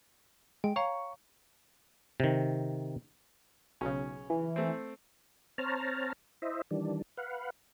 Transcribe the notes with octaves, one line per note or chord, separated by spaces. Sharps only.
G#3 G5
C#5 F5 A#5 C#6
C3 D#3
B1 C#3 C#4
E3
A3 C4
C4 C5 C#5 A5 A#5 F6
E4 C5 D#5 E5
D#3 E3 G3 D4
B4 F5 F#5